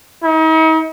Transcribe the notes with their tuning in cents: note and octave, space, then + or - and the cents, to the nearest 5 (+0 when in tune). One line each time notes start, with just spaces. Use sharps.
D#4 +40